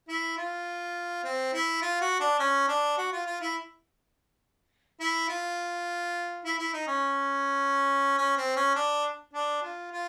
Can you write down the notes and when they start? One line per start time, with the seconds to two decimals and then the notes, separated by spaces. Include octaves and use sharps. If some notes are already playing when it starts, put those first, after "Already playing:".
0.08 E4
0.37 F4
1.24 C4
1.53 E4
1.82 F4
2.00 F#4
2.20 D4
2.39 C#4
2.68 D4
2.98 F#4
3.12 F4
3.26 F4
3.41 E4
5.00 E4
5.29 F4
6.45 E4
6.59 E4
6.73 D#4
6.87 C#4
8.18 C#4
8.37 C4
8.56 C#4
8.76 D4
9.33 D4
9.62 F4
9.91 F4